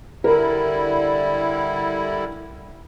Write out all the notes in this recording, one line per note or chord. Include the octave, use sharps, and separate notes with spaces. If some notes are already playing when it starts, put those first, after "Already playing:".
D3 G3 E4 A#4